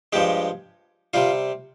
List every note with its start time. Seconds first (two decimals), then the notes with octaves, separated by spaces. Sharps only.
0.13 G2 F3 G#3 G4
1.14 C3 G3 F4